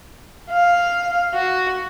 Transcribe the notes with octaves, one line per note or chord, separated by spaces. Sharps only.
F5
F#4